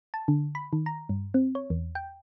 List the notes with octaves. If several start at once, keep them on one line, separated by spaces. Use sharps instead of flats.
A5
D3
B5
D#3
A#5
G2
C4
C#5
E2
G5